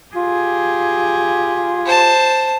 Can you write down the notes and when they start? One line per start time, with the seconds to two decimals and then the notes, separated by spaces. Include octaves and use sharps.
0.15 F4 G4 G#4
1.86 C5 A5